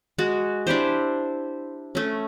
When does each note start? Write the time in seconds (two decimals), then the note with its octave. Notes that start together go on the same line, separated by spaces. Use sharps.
0.18 G#3 F#4
0.67 D4 E4 G4 C5
1.95 A3 C#4